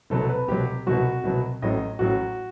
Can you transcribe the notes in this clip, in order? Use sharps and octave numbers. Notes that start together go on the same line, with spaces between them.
C2 B2 F#3 A4
B4
C2 B2 F#3 G4
C2 B2 F#3 F#4
C2 B2 F#3
A1 A2 F#3 D#5
A1 A2 F#3 F#4